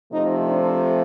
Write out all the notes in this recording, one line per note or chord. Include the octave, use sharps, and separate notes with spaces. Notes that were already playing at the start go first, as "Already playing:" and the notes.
C3 F3 A3 D#4
D4